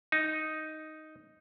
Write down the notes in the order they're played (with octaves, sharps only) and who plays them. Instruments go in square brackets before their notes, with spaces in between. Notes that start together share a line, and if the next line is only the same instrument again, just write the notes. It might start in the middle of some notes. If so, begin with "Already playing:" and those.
[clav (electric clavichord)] D#4